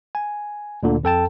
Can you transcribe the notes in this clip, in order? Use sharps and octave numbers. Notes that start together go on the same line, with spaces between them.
G#5
D2 A#2 D3
F2 A4 G5 A5